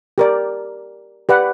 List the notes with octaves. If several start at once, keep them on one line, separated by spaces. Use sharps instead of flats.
G4 A#4 D5
G4 B4 D5 F#5